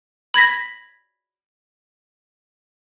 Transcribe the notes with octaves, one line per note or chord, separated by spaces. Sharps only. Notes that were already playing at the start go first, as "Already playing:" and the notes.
B5 G#6 A#6 B6